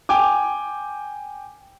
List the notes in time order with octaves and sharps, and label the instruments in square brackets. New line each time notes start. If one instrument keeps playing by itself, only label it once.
[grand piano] G5 G#5 D6